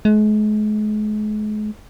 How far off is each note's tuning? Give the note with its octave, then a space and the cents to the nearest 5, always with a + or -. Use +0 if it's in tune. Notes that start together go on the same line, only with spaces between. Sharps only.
G#3 +40